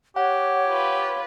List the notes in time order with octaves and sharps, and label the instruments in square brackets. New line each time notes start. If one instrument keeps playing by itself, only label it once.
[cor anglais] G4 [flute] C#5 [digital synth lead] F#5
[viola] F4 B4